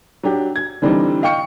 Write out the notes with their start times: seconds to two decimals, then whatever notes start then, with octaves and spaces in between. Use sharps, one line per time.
0.23 F#3 D4 G4
0.56 G#6
0.82 D3 E3 G3 C4 D4 D#4
1.22 D#5 F5 G5 C#6 C#7